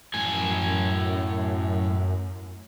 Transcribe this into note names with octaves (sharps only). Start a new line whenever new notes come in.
F#2 A2 G#5